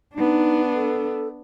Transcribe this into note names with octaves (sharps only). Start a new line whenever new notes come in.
B3 D4 D#4
A4